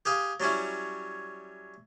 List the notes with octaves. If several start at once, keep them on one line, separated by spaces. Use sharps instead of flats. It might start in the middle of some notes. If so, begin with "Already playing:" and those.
G4 G#4 F5
F#3 G3 C#4 E4